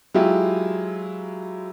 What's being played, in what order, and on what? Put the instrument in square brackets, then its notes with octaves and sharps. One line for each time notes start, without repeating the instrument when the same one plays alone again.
[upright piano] F#3 G#3 E4 F4 G4